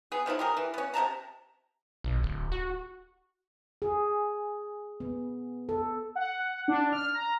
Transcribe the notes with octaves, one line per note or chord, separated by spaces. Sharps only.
B3 G#4
D#3 F3 F#3 E4
G4 G#4 A#4
E3
B3 C#4
C3 F#3 A5 A#5
B1
D1
F#4
G#4
B3
A4
F#5
D4
F6
A#5